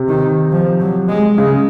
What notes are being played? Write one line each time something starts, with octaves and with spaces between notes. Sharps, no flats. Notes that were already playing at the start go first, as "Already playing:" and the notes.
Already playing: C3
D#3
F3
F#3
G#3
C#3 G#3